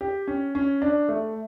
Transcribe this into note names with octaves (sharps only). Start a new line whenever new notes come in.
G4
C#4
C#4
D4
A3